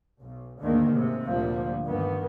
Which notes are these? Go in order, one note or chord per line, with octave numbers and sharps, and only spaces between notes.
B1
D2 G#2 D3 D#3 A#3
A1 G#2 C3
D2 A#2 F3 G3
G2 D#3 E3 B3